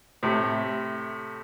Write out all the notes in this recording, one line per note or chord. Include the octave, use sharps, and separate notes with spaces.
A2 C3